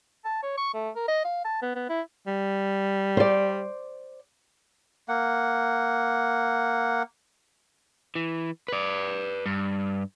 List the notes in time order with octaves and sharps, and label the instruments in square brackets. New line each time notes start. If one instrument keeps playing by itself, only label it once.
[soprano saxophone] A5
C#5
C#6
A3
A#4
D#5
F5
A5
B3
B3
E4
[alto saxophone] G3
[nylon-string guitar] C5 D5
[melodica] A#3 F#5
[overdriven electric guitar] E3
B4 D5
G2